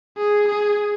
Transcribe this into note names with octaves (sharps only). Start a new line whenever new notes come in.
G#4
G#4